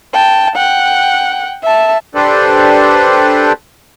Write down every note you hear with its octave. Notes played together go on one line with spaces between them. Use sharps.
G5 A5
F#5 G5
E5 A5
D4 G4 A4 B4 C5 D5